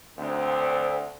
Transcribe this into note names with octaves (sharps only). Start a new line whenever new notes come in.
D2 C4